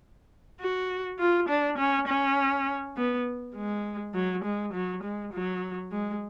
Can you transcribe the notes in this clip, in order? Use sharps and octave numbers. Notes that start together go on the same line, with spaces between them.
F#4
F4
D4
C#4
C#4
B3
G#3
F#3
G#3
F#3
G#3
F#3
G#3